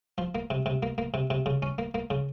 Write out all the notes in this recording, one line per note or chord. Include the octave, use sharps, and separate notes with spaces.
F3
A#3
C3
C3
A#3
A#3
C3
C3
C#3
C#4
A#3
A#3
C#3